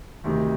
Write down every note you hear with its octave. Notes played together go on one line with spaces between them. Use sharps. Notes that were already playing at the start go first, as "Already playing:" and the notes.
D2 C3 D#3